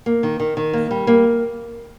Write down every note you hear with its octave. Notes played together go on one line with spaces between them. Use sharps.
A#3
D#3
D#3
D#3
A#3
G3
A#3